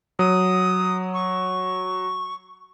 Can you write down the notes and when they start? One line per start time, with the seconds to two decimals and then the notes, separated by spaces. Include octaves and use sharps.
0.19 F#3 D#6
1.14 C#6